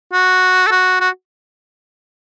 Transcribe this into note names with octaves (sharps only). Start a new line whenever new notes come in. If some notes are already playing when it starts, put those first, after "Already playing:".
F#4
A4
F#4
F#4